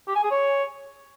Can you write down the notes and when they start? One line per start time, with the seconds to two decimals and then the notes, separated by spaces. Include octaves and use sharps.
0.07 G4
0.15 G#5
0.23 G#4
0.31 C#5